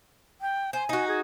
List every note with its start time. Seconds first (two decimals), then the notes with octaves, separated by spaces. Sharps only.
0.41 G5
0.73 C5 G#5
0.89 D#4 F#4
1.08 G#4